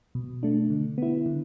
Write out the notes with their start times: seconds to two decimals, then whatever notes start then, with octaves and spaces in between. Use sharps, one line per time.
0.15 B2
0.43 A3 D4
0.70 D3
0.98 B3 E4
1.26 D3